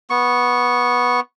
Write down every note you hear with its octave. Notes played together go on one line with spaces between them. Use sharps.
B3 C#6